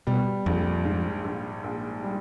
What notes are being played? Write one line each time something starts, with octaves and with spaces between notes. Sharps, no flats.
B2 G3
A#1 F2
G#2
A#1
A#1
G3